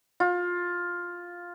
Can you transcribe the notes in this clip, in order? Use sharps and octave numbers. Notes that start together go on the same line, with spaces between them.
F4